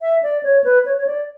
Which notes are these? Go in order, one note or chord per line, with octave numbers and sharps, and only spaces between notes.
E5
D5
C#5
B4
C#5
C#5
D5